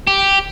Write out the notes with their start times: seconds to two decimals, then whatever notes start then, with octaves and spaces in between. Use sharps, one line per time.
0.07 G4